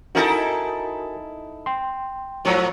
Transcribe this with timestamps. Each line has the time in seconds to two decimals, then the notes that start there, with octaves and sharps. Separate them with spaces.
0.15 D#4 E4 F#4 A4 A#4 G#5
1.66 G5 C6
2.45 G#2 F3 F#3